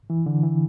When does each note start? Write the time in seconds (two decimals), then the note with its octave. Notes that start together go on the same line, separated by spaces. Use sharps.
0.10 E3
0.26 D3
0.43 E3